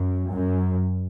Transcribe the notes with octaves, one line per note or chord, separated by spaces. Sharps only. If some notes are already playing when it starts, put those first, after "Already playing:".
Already playing: F#2
F#2